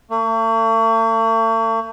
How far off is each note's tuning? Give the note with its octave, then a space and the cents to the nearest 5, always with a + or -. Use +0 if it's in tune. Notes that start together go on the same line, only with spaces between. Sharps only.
A3 +45